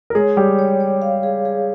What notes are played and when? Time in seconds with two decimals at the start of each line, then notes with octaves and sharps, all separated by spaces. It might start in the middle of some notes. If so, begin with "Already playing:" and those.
0.10 A#4
0.15 G#3 G#4 C#5
0.36 G3 G4 C#5
0.59 C#5
0.80 C#5
1.02 F5
1.23 G#4
1.45 G#4